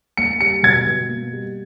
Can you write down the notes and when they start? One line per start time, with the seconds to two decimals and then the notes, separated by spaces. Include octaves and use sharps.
0.17 A#3 C#7
0.40 G3 C#7
0.63 B2 G#6
0.87 B2
1.09 A#3
1.33 G3